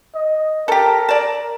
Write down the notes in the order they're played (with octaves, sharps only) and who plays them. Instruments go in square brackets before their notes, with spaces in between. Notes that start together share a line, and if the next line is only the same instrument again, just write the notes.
[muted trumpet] D#5
[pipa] G4 A4 [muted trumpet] A#4
[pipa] D5 A5